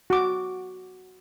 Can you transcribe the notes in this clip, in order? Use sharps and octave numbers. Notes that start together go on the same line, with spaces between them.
F#4 D6